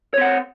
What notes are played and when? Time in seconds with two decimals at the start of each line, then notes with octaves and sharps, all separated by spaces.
0.14 C#5
0.18 C4
0.21 F#5